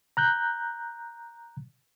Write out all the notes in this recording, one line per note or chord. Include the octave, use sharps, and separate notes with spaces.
A#5 F#6 G6